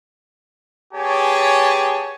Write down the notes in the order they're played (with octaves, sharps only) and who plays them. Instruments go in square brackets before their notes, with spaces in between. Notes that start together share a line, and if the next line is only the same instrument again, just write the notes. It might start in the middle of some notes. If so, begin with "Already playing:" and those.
[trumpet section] B3 G4 G#4 C#5 G#5 A5